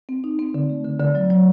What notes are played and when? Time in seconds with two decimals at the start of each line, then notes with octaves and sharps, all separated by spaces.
0.09 C4
0.24 D#4
0.39 C4
0.54 D3
0.70 A3
0.85 D3
1.00 D3
1.15 F#3
1.30 F#3